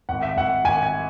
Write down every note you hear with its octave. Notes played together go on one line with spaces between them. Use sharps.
G#1 F#5
E5
G#1 F#5
G#1 G#5
G#5